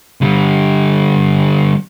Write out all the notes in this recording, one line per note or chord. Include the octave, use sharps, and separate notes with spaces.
D3 G3